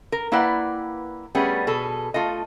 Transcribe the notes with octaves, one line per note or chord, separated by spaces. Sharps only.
A#4
A#3 E4 B4 D5 F#5 G5
G3 A3 B3 C#4 G#4
B2 G#4 A4
A3 F4 A4 D#5